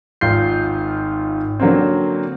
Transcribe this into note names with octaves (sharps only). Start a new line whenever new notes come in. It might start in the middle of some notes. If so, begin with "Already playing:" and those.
G#1 G#2 F4 G6 C7
D3 F#3 A#3 C4